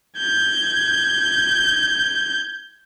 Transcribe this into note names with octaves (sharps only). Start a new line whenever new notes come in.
G6 G#6